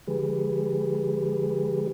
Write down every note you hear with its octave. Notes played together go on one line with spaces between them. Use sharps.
D3 F3 G#3 G4 G#4 B4